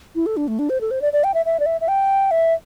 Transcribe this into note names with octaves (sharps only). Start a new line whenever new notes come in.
E4
A4
D4
A3
D4
C5
A4
C5
D5
D5
G5
E5
E5
D5
E5
E5
G5
E5